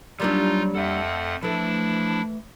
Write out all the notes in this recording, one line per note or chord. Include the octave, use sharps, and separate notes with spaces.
F#3 G3 A#3 D4 D#4 F4
F2 A4 E5 F#5
E3 F3 A3 D4 E4